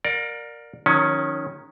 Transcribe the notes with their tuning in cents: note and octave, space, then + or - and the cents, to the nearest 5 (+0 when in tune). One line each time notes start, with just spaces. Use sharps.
A#4 +0 D5 +15 F5 +45
D#3 +0 F#3 -40 C#4 +0